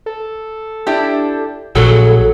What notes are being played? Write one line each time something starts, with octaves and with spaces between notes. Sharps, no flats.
A4
D4 E4 G4
A#1 F#3 G#4 A4